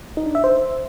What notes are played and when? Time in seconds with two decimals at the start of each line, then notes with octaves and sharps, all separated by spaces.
0.17 D#4
0.26 D4
0.35 E5
0.44 C5